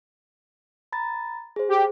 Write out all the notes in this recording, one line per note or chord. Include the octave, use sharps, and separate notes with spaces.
A#5 B5 A6
G#4 C5
G4